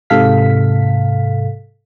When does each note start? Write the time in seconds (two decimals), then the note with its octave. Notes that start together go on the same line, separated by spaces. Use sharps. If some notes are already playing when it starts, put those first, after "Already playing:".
0.10 G#2 C3 A4 F5 B6